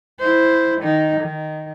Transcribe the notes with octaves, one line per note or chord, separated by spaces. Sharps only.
E4 C5
D#3 D#4
D#3